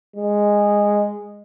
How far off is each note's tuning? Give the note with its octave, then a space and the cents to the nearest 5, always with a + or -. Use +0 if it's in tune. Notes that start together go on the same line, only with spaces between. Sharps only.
G#3 -10